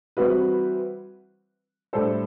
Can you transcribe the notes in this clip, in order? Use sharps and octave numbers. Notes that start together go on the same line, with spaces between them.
E3 G3 C4 F#4 B4
A2 G3 D4 A4 C5